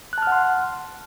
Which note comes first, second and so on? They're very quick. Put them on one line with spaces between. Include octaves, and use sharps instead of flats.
F#6 A5 F6 F#5 C6